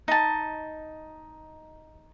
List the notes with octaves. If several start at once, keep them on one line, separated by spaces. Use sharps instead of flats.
D#4 A5